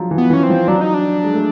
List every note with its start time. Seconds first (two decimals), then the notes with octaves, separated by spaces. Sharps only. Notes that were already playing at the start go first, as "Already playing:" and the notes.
Already playing: F3 F#3 G#3 D4
0.11 E3
0.18 B3
0.30 E3 C#4
0.43 C4
0.50 F3
0.68 F#3 D4
0.81 D#4
0.94 D4
1.24 G#3
1.34 A3